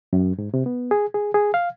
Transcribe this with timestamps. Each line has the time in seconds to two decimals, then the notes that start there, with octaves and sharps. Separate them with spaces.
0.13 F#2
0.38 G#2
0.54 C3
0.66 B3
0.91 G#4
1.14 G#4
1.34 G#4
1.54 F5